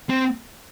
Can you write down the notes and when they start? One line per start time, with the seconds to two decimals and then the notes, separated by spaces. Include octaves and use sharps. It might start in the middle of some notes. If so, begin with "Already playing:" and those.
0.09 C4